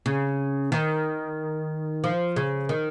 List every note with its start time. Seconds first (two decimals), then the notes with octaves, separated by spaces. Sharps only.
0.06 C#3
0.72 D#3
2.04 F3
2.36 C#3
2.69 D#3